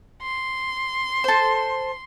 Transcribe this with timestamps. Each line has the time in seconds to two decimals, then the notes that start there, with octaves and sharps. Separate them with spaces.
0.22 C6
1.24 A4 C5